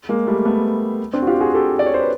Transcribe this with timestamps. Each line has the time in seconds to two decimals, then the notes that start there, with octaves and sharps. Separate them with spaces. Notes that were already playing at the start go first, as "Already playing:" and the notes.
0.09 G#3 A#3
0.27 G3 A3
0.45 A3 B3
1.13 C4 D4
1.22 F#4
1.27 F4 G4
1.41 F#4 G#4
1.54 G4 A4
1.79 D5
1.86 C#5
1.94 C5
2.01 B4